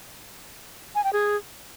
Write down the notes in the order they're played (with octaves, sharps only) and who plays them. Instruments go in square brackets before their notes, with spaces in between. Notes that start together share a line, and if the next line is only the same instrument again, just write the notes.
[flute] G#5
G5
G#4